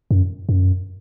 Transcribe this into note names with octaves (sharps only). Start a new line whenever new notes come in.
F#2
F#2